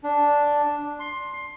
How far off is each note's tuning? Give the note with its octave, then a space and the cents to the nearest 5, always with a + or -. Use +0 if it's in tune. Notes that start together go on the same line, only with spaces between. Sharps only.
D4 -5
C6 +15